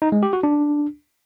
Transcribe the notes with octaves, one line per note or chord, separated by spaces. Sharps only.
D#4
G#3
G4
F#4
D4